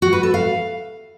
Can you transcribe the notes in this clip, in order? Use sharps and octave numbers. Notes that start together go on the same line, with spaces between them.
F#4
B4
A4
F5